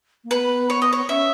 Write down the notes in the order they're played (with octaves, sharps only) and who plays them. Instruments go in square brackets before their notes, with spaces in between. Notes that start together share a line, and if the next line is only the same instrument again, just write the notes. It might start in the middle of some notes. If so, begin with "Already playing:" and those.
[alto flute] A#3
[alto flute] B3 [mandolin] B4
[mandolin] C#5
D#5
C#5
[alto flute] C#4 [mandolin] E5